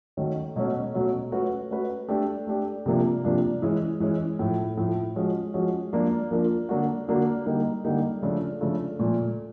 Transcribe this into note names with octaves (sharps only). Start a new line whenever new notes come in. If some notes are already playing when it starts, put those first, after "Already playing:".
D#3 F#3 A3 C#4
B2 F#3 A3 C#4
B2 F#3 A3 C#4
A3 C#4 F#4 B4
A3 C#4 F#4 B4
A3 D4 G4
A3 D4 G4
C3 F3 A#3 D4 F4
C3 F3 A#3 D4 F4
E3 G#3 C#4
E3 G#3 C#4
A2 F3 A3
A2 F3 A3
F3 G#3 C#4 F#4
F3 G#3 C#4 F#4
F3 A#3 D4 F4 A#4
F3 A#3 D4 F4 A#4
D3 F#3 A#3 D4 F#4
D3 F#3 A#3 D4 F#4
D3 G3 A#3 D#4
D3 G3 A#3 D#4
C#3 F3 A3 D4 F4
C#3 F3 A3 D4 F4
A#2 F3 A3